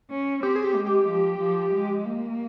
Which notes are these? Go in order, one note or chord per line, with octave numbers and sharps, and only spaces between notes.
C#4
C4 G4
G#4
G4
G#3
G4
F3
F3
G#3
A#3